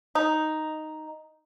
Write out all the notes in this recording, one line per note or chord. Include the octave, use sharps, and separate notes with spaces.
D#4